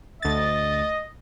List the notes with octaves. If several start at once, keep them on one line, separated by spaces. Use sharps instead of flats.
D2 D#5 A6